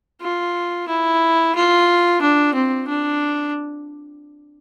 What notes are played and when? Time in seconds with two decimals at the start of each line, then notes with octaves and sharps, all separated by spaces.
0.21 F4
0.88 E4
1.55 F4
2.21 D4
2.54 C4
2.88 D4